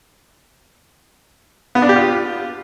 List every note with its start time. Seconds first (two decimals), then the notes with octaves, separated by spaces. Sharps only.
1.75 B3
1.82 D4
1.89 G4
1.96 F4